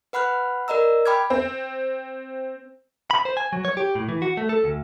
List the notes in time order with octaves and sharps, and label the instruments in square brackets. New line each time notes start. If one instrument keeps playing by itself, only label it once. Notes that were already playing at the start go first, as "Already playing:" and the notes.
[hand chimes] B4 F#5 B5 F6 F#6
A#4 D5 D#5 A#5 E6
G5 B5 D6 F6 G#6
[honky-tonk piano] C4
[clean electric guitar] B5
C5
G#5
F#3
C#5
G4
A2
E3
F#4
A3
A4
D2